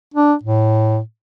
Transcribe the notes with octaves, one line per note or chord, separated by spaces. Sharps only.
D4
A2